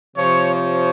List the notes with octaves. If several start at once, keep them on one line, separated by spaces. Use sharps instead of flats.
C3 F3 C#5
C#5